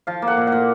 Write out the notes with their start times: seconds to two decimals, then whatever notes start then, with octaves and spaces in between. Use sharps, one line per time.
0.07 F3 F5
0.22 A#3
0.27 F#5
0.37 A#2
0.47 F#5
0.52 A#2